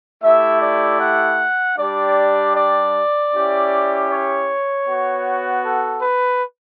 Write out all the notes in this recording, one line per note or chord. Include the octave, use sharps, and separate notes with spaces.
A3 E4 G4 E5
D5
F#5
G3 D4 G4 D5
D5
C#4 E4 G4
C#5
B3 F#4
A4
B4